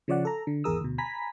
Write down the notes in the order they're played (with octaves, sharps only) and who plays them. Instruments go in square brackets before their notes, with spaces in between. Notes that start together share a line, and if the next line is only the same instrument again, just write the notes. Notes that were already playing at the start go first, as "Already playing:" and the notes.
[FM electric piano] C#3 F3 C#5 D5 F#5
A4 A#5
D3
G#1 E2 G#4 A#4 D#6 E6
D2 B2
G#5 A#5 B5 B6